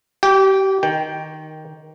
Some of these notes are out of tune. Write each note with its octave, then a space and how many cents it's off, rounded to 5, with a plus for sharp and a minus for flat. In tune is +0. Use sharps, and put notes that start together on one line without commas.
G4 -30 G5 +0
D#3 +0 G5 +0